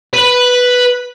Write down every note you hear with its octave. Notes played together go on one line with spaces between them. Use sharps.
B4 B5